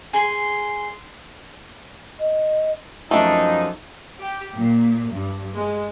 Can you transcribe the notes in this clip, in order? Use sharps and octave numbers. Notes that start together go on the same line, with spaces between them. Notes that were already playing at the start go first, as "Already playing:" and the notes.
G#4 C6
D#5
F#2 F3 A3 D4 D#4
G4
A#2
G2
G#3